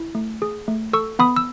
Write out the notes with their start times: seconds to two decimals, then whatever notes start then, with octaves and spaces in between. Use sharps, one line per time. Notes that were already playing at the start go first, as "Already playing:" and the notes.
Already playing: E4
0.15 A3
0.42 G#4
0.68 A3
0.93 A4 C#6 E6
1.19 B3 B5 D#6
1.36 E6